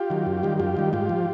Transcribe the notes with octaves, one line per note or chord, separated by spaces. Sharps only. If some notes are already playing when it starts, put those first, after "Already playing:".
Already playing: F4 G4
D#3 F#3
F#2
D#3 G3
F#2 F4 G4
D#3 G3
G#2 F4 G4
F3